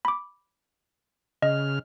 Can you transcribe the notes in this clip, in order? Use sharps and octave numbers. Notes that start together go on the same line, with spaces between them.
B5 D6
C#3 D#5 F6